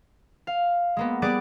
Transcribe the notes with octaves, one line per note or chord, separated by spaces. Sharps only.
F5
G#3 A#3 B3
G3 B3 G#4 D5 F#6 D7